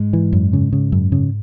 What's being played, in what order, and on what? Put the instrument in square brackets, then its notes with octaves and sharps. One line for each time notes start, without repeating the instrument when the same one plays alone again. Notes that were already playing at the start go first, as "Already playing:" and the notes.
Already playing: [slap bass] G#2 G#3
[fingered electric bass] E3
F#2
C#3
C#3
F#2
C#3